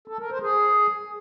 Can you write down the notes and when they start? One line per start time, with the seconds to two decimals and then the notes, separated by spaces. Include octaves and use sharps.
0.08 A4
0.19 A#4
0.31 C5
0.42 G#4